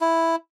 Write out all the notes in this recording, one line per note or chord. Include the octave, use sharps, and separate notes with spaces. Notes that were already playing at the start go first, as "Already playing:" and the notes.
E4